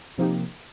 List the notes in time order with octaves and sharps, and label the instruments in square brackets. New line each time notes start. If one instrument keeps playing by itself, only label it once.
[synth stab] C3 F3 A#3 D#4 G4